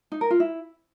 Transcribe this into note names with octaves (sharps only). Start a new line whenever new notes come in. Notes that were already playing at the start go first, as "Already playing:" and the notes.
D#4
A#4
F4
E4